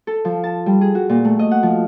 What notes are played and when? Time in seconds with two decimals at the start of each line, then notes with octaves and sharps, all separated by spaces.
0.07 A4
0.25 F3
0.44 A5
0.66 G3
0.81 G#4
0.95 F#4
1.09 A#2
1.24 A3
1.39 D#5
1.51 F#5
1.63 F3